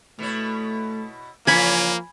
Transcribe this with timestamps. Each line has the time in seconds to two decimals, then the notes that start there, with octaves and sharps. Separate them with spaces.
0.19 B2 A3 E4 C#5
1.47 C#3 E3 F3 A#3 C#4 G#5 B5